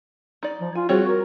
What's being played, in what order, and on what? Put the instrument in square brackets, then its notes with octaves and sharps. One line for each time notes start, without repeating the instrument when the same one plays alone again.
[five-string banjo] D#4 D5
[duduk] F3
[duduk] F4 [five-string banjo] G#5
[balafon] G3 G#4 C5 [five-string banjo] C4 F4 C#5 [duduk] F#4
[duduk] A#4